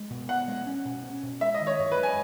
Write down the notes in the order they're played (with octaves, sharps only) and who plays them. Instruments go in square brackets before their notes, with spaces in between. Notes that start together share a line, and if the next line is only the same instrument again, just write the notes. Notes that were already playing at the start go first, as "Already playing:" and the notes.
Already playing: [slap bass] G#3
B2
[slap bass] B2 [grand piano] F#5
[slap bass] G#3
C#4
B2
C#4
B2
[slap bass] G#3 [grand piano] E5
[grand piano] D#5
[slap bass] D#3
[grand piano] C#5
[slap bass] F#2
[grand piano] B4
[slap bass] G#3
[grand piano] G#5